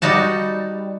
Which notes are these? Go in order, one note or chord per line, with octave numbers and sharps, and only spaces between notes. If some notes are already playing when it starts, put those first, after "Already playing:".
G3 D#4 F#4 A5